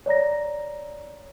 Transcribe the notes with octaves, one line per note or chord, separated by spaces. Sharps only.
C#5 D5 A#5 A#6